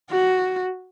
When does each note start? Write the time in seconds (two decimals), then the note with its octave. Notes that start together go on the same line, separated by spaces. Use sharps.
0.10 F#4